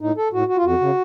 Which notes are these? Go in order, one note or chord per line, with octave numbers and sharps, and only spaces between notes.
A2 D#4
A4
A2 F#4
F#4
F4
F2 F#4
C#3